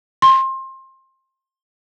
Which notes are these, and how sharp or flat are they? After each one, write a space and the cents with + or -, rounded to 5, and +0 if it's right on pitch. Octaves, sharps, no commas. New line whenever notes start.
C6 +25